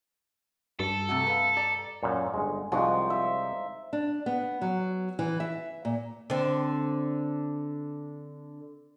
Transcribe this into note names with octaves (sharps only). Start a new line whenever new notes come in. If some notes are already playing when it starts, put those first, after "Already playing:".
G2 A4
C3 A3 F#4
B4 F5
G4 D5 A#5
F#2 A#2
G1 G#3
C2 F3 G#3 D#4 F#4
E5
D4
B3
F#3
E3
E5
A#2
D3 C4